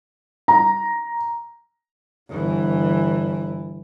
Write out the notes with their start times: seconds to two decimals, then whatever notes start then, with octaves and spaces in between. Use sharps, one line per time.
0.48 A#5
2.30 G1 E3